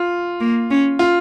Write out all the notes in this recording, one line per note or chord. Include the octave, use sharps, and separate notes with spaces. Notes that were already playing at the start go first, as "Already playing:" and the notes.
Already playing: F4
A#3
C#4
F4